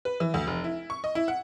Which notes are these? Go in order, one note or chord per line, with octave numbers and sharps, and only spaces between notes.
B4
E3
D2
F1
E4
C#6
D#5
E4
F#5